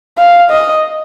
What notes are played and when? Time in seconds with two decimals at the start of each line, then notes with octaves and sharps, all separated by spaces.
0.18 F5
0.51 D#5